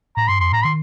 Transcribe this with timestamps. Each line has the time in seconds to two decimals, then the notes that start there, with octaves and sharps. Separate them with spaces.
0.17 A2 A#5
0.28 G2 C6
0.40 F2 C6
0.52 A2 A#5
0.64 D#3 C6